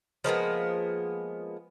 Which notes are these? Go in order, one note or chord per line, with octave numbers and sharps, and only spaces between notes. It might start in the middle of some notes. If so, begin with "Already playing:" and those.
F3 G#3 A#3 B3